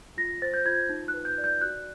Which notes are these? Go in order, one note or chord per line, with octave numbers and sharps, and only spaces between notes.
F4 A#6
C5 A6
G6
F4 G#6
D#4
F#6
B4
G6
D5
G6
F#4 F#6